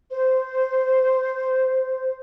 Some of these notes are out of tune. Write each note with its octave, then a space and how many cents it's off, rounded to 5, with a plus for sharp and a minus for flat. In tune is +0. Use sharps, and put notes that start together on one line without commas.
C5 -10